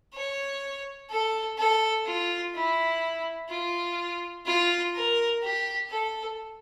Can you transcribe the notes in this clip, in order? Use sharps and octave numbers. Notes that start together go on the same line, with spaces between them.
C#5
A4
A4
F4
E4
F4
F4
A#4
G4
A4